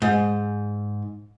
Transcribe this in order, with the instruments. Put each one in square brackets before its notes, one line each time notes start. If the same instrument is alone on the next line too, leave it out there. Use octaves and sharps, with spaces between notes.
[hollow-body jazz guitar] G#2